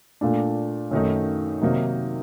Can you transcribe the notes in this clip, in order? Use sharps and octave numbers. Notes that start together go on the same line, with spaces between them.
A#2 A3 D4
F#2 D#3 A3 D#4
C3 D#3 F#3 A#3 D#4